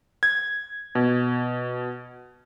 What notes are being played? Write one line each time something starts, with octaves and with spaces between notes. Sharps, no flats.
G#6
B2